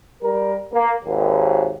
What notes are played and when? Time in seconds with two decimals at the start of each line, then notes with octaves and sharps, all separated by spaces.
0.22 G3 A#4
0.73 A#3
1.04 G#1 D#2